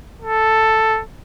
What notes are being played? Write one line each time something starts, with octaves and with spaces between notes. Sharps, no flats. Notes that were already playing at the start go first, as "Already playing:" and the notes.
A4